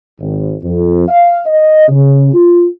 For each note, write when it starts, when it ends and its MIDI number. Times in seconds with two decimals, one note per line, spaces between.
0.20 0.52 32
0.64 1.07 41
1.08 1.39 77
1.46 1.86 75
1.88 2.30 49
2.34 2.66 65